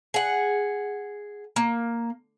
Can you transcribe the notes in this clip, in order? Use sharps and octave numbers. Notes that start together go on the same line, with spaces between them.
G#4 F#5
A#3